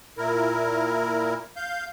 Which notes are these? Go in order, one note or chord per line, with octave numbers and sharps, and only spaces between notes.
A#2 E4 A#4
F5 G6